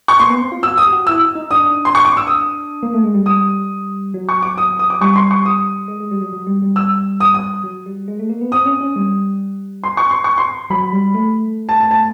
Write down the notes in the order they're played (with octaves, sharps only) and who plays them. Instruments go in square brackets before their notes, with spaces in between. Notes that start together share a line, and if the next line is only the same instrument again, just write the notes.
[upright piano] C#6
[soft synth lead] A#3 [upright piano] C6
[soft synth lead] B3
C4
F4
[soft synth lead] F#4 [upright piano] E6
[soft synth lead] G4 [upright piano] D#6
[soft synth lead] F#4
[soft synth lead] E4 [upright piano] E6
[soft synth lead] D#4
[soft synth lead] D4 [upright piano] D#6
[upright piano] C6
C#6
D6
E6
D#6
[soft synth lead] A#3
A3
G#3
G3
[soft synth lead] G3 [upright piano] D#6
[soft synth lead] F#3
[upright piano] C#6
D6
D#6
D#6
D6
[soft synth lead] G3 [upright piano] C#6
[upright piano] C6
C#6
D#6
[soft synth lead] G#3
G#3
G3
F#3
F#3
G3
G3
[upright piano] E6
D#6
D#6
[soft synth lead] F#3
G3
G#3
A3
A#3
B3
[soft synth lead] C4 [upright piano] D#6
[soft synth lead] C#4
C#4
G3
[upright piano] C6
C#6
C6
C#6
C6
[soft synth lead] F#3 [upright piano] B5
[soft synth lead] G3
A3
[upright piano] A5
A5
A5